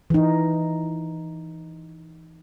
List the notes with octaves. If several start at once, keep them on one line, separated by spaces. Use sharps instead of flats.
E3 D#4